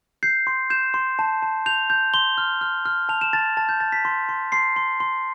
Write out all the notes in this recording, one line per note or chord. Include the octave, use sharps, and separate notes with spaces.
G6 C7
C6
G6 E7
C6
A5
A5
G6 F7
G6
C6 G7
F6
F6
F6
A5 F7
E7
A5 A6
A5 A6
G6
A5 A6
B6
C6
C6
C6 C7
C6
C6